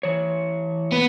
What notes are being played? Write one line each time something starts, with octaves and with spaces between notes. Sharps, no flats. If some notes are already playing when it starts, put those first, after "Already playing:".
E3 C#5
B3